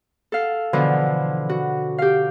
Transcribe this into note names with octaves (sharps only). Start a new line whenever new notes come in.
A4 F5
B2 D3 E3 F3
F#4
G4 F5